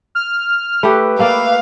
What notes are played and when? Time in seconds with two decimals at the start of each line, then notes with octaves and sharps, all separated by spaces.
0.15 F6
0.83 A3 G4 B4
1.19 A3 A#3 D5 F5